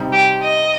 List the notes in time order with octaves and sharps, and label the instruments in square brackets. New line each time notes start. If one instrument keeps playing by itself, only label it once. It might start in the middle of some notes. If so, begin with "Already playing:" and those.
Already playing: [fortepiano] C3 G3 D#4
[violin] G4
D#5